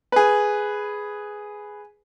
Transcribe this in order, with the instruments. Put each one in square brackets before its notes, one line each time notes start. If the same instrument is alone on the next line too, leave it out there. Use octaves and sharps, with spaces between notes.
[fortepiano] G#4 B4